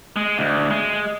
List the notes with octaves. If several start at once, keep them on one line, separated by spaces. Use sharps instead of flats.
G#3
D2
G#3